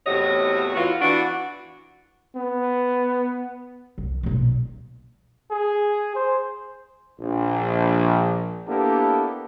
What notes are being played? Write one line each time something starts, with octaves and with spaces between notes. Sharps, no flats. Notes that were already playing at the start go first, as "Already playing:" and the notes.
E2 A2 C3 F#4 C#5 D#5
E3 F4 F#4
E3 B3 D4 F#4
B3
C2
B1 A#2
G#4
C5
A#1
A#3 B3 D4 E4 G4 A4